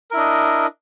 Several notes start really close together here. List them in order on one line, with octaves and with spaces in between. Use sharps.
A#4 E4 D4 D#5